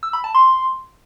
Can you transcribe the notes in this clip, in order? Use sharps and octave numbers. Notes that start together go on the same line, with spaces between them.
E6
B5
A5
C6